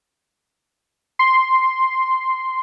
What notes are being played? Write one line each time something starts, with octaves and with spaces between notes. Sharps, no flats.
C6